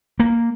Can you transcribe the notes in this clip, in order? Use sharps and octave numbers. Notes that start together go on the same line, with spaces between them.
A#3